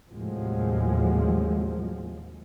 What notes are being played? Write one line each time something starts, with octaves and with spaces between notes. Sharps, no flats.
D#2 A2 C3 F3 F#3 G#3